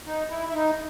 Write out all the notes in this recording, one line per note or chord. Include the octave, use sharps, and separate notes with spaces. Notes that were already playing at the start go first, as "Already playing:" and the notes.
D#4
E4
E4
D#4